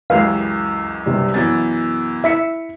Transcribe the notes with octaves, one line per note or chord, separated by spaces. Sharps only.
C#2 F#2 E3 G4 B4 F5
G2 C3 G3
F#2 B2 E3 A6
E4 E5 B6 C#7